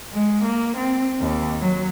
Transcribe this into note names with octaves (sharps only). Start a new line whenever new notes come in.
G#3
A#3
C4
D#2
F#3